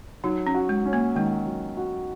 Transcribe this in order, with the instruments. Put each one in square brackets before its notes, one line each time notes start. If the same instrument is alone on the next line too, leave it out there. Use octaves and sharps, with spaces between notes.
[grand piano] F#3 [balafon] D#4
[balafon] C#4
[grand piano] F#4
[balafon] G#3
[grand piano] C#4
[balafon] A#3
[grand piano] D#3 [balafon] G#3
[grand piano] F#3
F#4